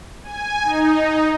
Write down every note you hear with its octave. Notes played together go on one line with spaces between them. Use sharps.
G#5
D#4